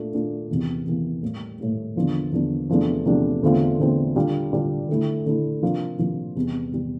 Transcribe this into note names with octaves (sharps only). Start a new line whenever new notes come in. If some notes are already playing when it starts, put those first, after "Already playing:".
Already playing: A#2 A3 D4 F4
A#2 A3 D4 F4
E2 C3 E3 A#3
E2 C3 E3 A#3
A2 G3 A#3
A2 G3 A#3
E2 D3 F3 A#3 D4
E2 D3 F3 A#3 D4
E2 C3 F3 A3 D4
E2 C3 F3 A3 D4
E2 D3 A3 C4 F4
E2 D3 A3 C4 F4
D3 G3 D4 F4
D3 G3 D4 F4
D3 A3 E4
D3 A3 E4
C3 F3 A#3 D4 F4
C3 F3 A#3 D4 F4
E2 C3 G3
E2 C3 G3